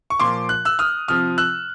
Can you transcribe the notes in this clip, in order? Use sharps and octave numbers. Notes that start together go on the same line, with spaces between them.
C#6
A#2 F3 C6 D6
F#6
E6 F#6
D#6 F6
C3 F3 D#6 F6
E6 F#6